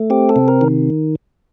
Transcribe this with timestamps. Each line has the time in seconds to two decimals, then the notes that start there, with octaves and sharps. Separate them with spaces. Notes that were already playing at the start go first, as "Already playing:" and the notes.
Already playing: A3
0.10 C4 G4
0.29 A4
0.36 C3
0.48 A#4
0.61 D#3